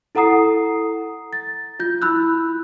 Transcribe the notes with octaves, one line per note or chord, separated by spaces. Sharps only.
E4 A4 F#5 A#5 D#6 C7
A6
F4 G6
E4 B5 E6 F#6